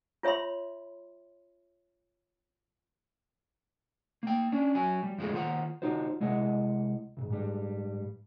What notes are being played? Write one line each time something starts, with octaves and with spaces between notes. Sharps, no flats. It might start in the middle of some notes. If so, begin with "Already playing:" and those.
F4 C#5 E5 B5 C6
A#3 G5
C#4 D4
F#3 G#5
G3
F2 F3 G#3 A4
D#3 F4 C5 F#5
D#4 F4 F#4 C5
C2 G#3 E4 D#5 F#5
D2 G#2
G#2 G3